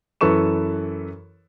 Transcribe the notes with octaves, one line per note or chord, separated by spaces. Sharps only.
F#2 E3 A4 B4 C#6 E7